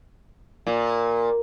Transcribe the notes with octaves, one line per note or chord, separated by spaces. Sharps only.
A#2